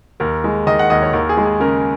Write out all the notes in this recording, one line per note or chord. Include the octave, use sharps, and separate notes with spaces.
D#2 A#4
G#3
D#3 D#5
F#5
D#2 D#5
C#5
D#2 A#4
G#4
G#3
G#4
C#3 A#4